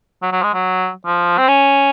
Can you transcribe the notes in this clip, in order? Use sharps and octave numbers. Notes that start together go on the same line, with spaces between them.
F#3
F#3
G#3
F#3
F3
C4
C#4